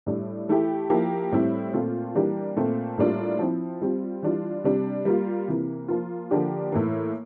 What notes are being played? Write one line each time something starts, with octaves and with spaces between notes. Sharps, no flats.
A2 G3 D4
E3 A3 E4 G4
F3 A#3 E4 G4
A2 G3 C4 E4
A#2 A3 C4 F4
E3 G3 A#3 D4 G4
A#2 A3 C4
A2 G3 A#3 D4 F4
F3 C4 E4
G3 C4 F4
E3 G3 D4 F4
C3 G3 D4
G3 A#3 F4
C3 E3 A#3
F3 A#3 F4
D3 F3 A#3 D4 G4
A2 E3 A#3